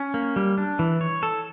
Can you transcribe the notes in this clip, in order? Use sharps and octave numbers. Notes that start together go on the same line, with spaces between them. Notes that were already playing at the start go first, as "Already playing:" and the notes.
Already playing: C#4
A#3
G3
D4
E3
C#5
A4